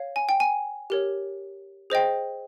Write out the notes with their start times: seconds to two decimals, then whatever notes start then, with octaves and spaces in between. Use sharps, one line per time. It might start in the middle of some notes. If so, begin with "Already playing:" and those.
Already playing: C#5 F5
0.16 G#5
0.29 G5
0.40 G#5
0.90 G4 A#4 C#5
1.90 G#4 C5 D#5 G5